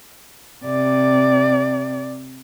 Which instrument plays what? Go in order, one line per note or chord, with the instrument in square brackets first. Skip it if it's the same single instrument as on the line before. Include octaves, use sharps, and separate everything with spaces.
[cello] C3 [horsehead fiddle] D5